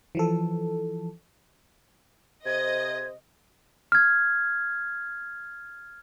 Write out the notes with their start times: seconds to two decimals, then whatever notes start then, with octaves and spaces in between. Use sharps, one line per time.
0.15 E3 F3 A4
2.46 C3 C5 D#5 G#6
3.92 F6 G#6